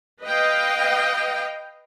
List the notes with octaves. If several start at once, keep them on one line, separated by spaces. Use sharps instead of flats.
B4 D#5 F5 G5